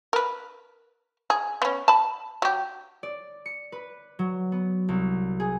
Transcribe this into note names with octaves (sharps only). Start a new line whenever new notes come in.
A#4 B4
G#4
B3 C#4
A5 B5
F#3 G4
D5
C#7
B4
F#3
B3
C2
G#4